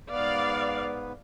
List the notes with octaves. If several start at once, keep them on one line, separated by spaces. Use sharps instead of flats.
G#2 B3 B4 D5 F5